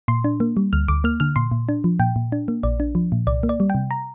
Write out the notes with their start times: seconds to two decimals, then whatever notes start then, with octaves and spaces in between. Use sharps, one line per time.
0.08 A#2 C6
0.24 D4
0.40 A#3
0.57 G3
0.73 D2 F6
0.88 D2 D6
1.04 A#3 F6
1.20 D3 F6
1.36 A#2 C6
1.52 A#2
1.69 D4
1.84 F3
1.99 A#2 G5
2.16 A#2
2.32 D4
2.48 A#3
2.63 A#1 D5
2.80 D4
2.95 F3
3.12 A#2
3.27 C2 D5
3.43 A#3
3.49 D5
3.60 G3
3.70 G5
3.75 C3
3.91 A#5